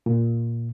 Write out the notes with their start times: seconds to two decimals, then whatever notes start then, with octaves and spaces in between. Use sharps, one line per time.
0.06 A#2